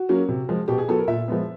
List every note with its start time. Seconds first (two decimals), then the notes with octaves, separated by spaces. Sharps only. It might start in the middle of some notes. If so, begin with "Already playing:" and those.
Already playing: F#4
0.09 F#3 A#3 C#4
0.29 C3
0.49 F3 G#3
0.68 B2 G4
0.78 G#4
0.88 F#3 B3 A4
0.99 A#4
1.08 A#2 E5
1.28 F3 G#3 B3